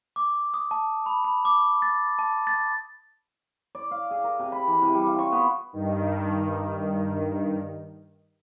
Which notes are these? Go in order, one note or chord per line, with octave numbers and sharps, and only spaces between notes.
D6
D#6
A5
B5
B5
D6
A6
A5
A6
D5
F5
G#4
A#4
C3
B5
E3
C3
G3
F4
C#6
B3
G2 D#3